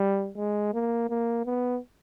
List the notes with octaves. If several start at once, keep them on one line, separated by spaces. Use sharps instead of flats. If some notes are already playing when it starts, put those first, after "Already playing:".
Already playing: G3
G#3
A#3
A#3
B3